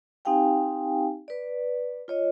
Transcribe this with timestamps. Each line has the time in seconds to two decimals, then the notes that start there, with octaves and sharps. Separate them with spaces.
0.25 C4 D#4 G4 F5 G5 G#5
1.28 B4 D5
2.08 F4 C#5 D#5